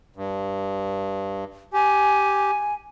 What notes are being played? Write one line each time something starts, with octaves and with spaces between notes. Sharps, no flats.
G2
G4 G#5